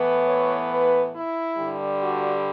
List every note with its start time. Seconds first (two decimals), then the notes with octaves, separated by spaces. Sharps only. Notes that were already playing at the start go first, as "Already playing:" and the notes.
Already playing: A2 E3 B3
0.25 C#5
0.69 B4
1.13 E4
1.57 G2 D3 G3
2.01 F#4